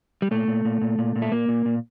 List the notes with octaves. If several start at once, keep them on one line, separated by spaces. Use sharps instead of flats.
G3
A#2 A3
A#2
A#2
A#2
A#2
A#2
A3
A#2 A#3
A#2
A#2